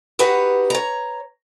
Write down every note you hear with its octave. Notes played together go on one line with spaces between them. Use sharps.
D#4 F#4 G4 B4 C#5
C#5 A#5